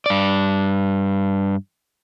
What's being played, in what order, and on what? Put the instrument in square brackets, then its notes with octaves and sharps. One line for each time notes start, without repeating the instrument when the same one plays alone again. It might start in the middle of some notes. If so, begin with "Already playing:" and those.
[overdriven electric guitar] G2 D5